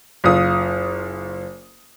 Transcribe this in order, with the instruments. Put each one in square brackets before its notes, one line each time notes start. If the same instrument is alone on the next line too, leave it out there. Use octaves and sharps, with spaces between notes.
[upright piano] F#1 F4 D#6